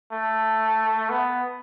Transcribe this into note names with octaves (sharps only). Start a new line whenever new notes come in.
A3
B3